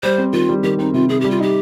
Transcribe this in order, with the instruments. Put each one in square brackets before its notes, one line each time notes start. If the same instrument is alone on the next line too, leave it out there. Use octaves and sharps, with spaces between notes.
[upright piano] G3 [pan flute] C5
[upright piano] C4
[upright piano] D#3 [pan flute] F4
[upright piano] G3
[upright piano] D#3 [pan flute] G4
[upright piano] C4 [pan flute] D#4
[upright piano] C3 [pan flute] F4
[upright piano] C3 [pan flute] G#4
[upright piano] G3 [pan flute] G4
[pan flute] F4
[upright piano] D#4 [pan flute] G4